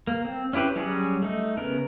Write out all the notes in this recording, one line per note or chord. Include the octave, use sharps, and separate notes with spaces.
A#3
C4
C#4 E4 G4 B4 C5
F#3 G3 C#4 F#4 G#4
A3 D#4
C#3 B3 A#4